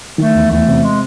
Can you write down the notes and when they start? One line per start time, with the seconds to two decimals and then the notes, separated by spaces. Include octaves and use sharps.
0.18 D#3 A3
0.35 E2
0.51 E2 A3
0.68 C3
0.84 G#3